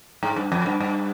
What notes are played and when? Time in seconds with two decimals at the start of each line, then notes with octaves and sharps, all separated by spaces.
0.23 G#2
0.36 G2
0.52 F2
0.66 G2
0.80 G2